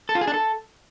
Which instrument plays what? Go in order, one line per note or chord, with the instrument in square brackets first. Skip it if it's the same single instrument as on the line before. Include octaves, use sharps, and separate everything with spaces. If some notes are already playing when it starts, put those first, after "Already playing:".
[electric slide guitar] A4
F4
G#4
D4
A4